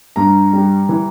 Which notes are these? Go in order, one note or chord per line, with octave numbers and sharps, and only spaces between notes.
G2 A#5
G3
E3